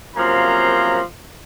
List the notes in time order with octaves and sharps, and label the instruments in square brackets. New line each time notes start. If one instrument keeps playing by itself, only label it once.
[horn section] F#2 C3 F3 A#3 A#5 C6